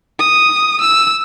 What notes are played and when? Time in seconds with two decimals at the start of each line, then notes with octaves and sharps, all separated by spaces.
0.19 D#6
0.81 E6